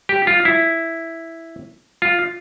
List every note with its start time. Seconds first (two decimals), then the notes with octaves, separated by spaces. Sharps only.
0.09 G4
0.27 F4
0.45 E4
2.02 F4